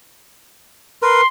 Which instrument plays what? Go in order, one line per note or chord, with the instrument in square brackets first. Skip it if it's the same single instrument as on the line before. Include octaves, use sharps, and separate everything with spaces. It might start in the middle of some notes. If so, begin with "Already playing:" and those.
[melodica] A#4 B4 [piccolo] C6